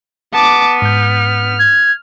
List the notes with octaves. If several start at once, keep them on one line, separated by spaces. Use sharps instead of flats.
B3 A5 D6
G#2 F6 G6
G#6